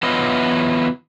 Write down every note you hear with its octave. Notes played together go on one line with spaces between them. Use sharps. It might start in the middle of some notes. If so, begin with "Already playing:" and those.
E3 F#3 B3 E4 F4 D#5